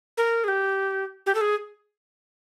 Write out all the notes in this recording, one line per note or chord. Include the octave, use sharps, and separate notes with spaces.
A#4
G#4
G4
G4
A4
G#4